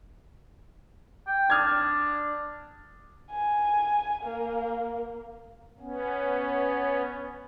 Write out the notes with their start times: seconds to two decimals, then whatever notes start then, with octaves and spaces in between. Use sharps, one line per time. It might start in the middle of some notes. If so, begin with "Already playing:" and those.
1.27 G5
1.50 D4 D#6 F6 G#6
3.31 G#5
4.23 A#3
5.80 B3 C#4